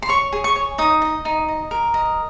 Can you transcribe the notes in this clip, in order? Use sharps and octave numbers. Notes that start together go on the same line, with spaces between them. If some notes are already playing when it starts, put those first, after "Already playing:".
C6
C#5 C#6
G#4
C#6
C#5
D#4 D#6
D#5
D#4
D#5
A#4
D#5